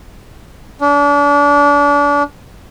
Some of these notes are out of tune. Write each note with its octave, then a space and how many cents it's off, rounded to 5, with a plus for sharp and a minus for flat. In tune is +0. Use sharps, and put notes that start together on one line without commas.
D4 -35